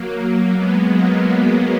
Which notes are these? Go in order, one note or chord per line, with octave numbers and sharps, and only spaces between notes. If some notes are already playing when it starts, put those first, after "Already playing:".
Already playing: F#3 A#3
F#3 A#3
G#3 B3
F#3 A#3